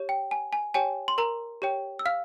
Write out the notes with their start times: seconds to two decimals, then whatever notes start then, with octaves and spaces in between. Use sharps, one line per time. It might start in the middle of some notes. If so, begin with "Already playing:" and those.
Already playing: G4 C#5
0.09 G5
0.31 G#5
0.53 G#5
0.74 G4 C#5 G5 G#5
1.08 C6
1.18 A#4 A#5
1.62 G4 C#5 G5
1.99 E6
2.06 F5 F6